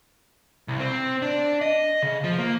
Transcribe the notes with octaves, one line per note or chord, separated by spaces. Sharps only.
C2
C4
D4
D#5
C#3
F3
A#3